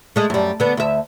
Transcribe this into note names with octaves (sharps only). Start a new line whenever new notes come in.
G#3 A3
F#2 G3
D3 B3
D2 E5